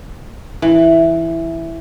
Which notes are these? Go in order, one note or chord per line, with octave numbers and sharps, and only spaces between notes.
E3